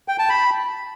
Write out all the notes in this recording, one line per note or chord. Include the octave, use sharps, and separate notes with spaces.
G5
A5
B5